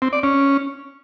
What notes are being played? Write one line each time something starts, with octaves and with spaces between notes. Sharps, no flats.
C4
D5
C#4